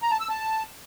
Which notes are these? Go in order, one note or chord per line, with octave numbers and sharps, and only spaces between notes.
A#5
A5
E6
A5